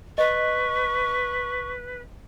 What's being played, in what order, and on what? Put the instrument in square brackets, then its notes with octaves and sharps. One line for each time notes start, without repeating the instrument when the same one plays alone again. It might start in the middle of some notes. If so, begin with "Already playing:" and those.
[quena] B4 [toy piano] D#5 [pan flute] C#6